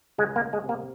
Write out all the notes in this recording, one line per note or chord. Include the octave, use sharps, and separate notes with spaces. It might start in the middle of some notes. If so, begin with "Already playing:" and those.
C#2 G#3
A#3
C#2
G#3
C3
A#3